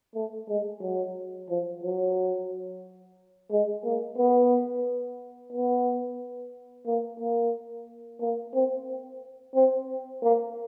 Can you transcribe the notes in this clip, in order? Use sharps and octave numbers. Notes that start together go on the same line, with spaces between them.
A3
G#3
F#3
F3
F#3
G#3
A#3
B3
B3
A#3
A#3
A#3
C4
C4
A#3